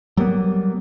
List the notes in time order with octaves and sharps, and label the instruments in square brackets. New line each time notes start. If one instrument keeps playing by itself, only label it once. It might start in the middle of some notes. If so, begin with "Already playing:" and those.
[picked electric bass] F#3 G3 A#3 B3